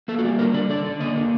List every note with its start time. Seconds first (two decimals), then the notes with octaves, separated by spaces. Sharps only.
0.08 A#3 A4
0.19 F#4
0.24 G3 G4
0.39 D3 A#4
0.54 D3 D5
0.70 D3 D5
0.85 D3
1.00 A#3 D#5
1.16 D3